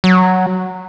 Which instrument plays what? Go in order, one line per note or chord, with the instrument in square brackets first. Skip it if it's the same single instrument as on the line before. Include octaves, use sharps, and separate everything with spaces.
[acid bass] F#3